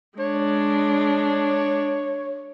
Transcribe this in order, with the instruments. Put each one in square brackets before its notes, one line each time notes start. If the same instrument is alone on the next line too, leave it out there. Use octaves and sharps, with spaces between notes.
[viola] G#3 D4 [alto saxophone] C#5